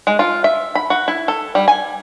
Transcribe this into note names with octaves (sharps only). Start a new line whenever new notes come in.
G#3
F4
E5
B5
F#4
E4
A4
G3
G#5